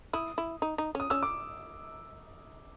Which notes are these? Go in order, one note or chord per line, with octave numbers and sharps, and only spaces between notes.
E4 D#6
E4
D#4
D#4
C#4 D#6
C#4 E6
D6